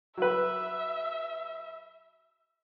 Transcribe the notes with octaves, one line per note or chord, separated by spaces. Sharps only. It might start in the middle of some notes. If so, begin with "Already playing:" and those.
F#3 B4 E5